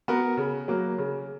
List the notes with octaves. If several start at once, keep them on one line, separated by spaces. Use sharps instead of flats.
B3 F#4 A#4
C#3
F#3 A#3
C#3